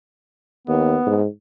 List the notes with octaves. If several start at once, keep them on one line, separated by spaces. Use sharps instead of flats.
D#2 B3
G#2